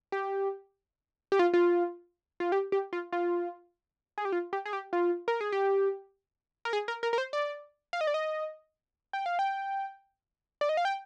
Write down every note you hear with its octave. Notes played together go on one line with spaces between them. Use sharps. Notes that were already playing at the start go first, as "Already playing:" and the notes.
G4
G4
F4
F4
F4
G4
G4
F4
F4
G#4
G4
F4
G4
G#4
G4
F4
A#4
G#4
G4
A#4
G#4
A#4
A#4
A#4
C5
D5
F5
D#5
D5
D#5
G5
F5
G5
D5
D#5
F5
G5